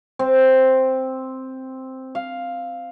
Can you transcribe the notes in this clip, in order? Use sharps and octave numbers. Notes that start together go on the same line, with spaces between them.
C4
F5